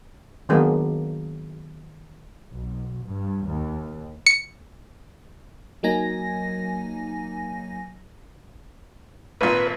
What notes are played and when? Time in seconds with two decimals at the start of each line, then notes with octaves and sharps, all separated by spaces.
0.49 D#3 F#3 G#3 A#3 B3 D4
2.52 B1
3.05 G2
3.49 D#2
4.26 C#7
5.83 F#3 A#3 D#4 G#5 A#6
9.41 G#1 A#2 B4